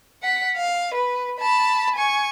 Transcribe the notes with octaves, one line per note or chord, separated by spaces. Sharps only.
F#5 B6
F5
B4
A5 B5
G#5 C#6